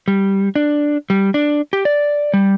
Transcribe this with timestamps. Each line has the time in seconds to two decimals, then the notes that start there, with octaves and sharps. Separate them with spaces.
0.08 G3
0.56 D4
1.10 G3
1.34 D4
1.73 G4
1.85 D5
2.34 G3